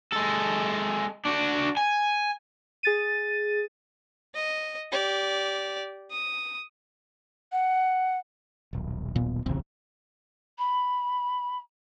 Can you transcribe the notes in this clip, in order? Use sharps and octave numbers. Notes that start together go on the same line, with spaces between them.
G#3 A4
D4 F#4
G#5
G#4 A6 D#7
D#5
G4 D5
D#6
F#5
D#1 B1
A#2 B3
D1 A#1 E2 C#3 C4
B5